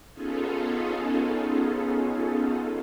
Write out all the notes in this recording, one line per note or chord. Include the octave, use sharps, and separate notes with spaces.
B3 C#4 D#4 F4 G#4 A4